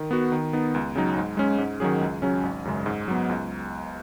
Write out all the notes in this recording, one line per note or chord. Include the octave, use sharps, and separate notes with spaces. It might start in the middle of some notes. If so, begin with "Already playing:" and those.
Already playing: D#3
B3 F#4
D#3
B3 D#4
C#2
C#3 F#3 D#4
G#2
G#3 C#4
G#2
D#3 F#3 C#4 G#4
C#2
C#3 F#3 C#4
G#1
F#2 C#3 G#3
G#2
F#3 B3
C#2